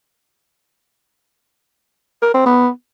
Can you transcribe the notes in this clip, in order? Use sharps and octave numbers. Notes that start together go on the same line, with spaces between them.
A#4
C4
B3